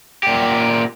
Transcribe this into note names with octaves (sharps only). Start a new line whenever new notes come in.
A#2 G4